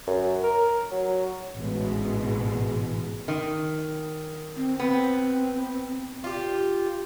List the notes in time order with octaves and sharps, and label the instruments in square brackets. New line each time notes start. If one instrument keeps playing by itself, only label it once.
[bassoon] F#2
A#4
F#3
[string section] A1 G#2 B2 E3 G#3
[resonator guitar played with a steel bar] D#3
[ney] C4
[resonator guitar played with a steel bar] B3 [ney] C4
[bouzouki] F4 G4